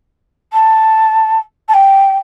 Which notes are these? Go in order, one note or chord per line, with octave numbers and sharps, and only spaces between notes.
A5
A5
G5